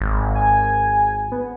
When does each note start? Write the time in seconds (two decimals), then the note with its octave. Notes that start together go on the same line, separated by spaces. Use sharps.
0.01 G#1
0.35 G#5
1.32 B3